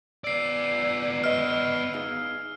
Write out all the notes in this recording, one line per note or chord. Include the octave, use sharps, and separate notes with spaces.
B3 D5 E6 C7
B4 D#5 F6
D#4 G#4 F5